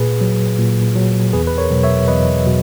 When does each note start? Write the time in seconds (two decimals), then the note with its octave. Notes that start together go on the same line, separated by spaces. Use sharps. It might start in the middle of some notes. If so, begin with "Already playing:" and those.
Already playing: A#2 G#4 B4
0.21 F#3
0.59 A#2
0.96 F#3
1.33 E2 G#4 B4
1.47 B4
1.58 A#4 C#5
1.70 B2 F#3
1.83 C#5 E5
2.08 E2 B4 D#5
2.46 B2 F#3